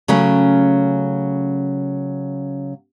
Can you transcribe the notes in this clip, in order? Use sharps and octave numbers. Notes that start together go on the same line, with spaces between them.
C#3 F#3 A3 C#4